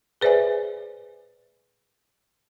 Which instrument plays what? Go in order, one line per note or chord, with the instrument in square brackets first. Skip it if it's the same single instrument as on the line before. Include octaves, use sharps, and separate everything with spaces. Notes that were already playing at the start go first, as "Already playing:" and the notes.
[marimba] G#4 B4 C5 D5 E5 G#5